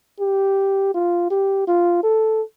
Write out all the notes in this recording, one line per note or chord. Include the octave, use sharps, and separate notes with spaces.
G4
F4
G4
F4
A4